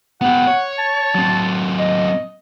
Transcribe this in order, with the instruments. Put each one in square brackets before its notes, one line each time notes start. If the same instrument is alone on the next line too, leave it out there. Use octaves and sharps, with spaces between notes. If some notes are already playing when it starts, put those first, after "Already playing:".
[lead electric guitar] B3 G4 [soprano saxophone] F#5
[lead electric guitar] C#5
[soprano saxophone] A5
[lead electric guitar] F#3 C4
[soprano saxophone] D#5